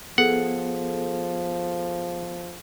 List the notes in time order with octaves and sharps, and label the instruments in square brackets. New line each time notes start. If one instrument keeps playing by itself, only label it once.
[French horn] F3 [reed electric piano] B3 [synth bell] G#4 A4 [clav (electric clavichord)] F#5